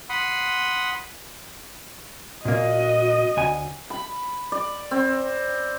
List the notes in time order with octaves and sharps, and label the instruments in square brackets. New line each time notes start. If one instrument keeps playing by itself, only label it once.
[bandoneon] F#5 B5 C6 D#6
[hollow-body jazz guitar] A#2 A#3 [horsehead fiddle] F#4 D#5
[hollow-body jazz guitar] D2 G#5
[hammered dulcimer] B5
D5
C4